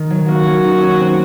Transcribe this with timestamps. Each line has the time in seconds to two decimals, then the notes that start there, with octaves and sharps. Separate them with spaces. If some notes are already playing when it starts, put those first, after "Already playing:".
Already playing: D#3
0.10 F#3
0.28 A#3 F#4
0.47 C#4
0.65 D#4
0.82 C#4
1.00 C4